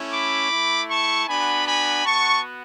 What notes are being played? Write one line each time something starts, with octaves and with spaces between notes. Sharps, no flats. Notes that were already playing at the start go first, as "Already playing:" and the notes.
Already playing: A3 C#4 E4
B5 D6
A3 E4
A5 C#6
B3 D4 F#4 G#5 B5
G#5 B5
B3 F#4 A5 C#6